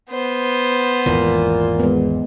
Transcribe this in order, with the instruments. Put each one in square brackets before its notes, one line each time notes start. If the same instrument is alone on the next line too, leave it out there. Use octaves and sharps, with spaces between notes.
[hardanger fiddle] B3 C5
[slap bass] G#1 E2 E3 [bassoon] A#2
[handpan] G#3 B3